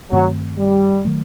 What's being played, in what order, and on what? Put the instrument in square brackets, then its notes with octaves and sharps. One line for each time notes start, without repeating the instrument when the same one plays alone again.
[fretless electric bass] G2 D#3 A3 C4 [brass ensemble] F#3
[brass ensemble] G3
[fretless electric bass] D#3 F#3 A3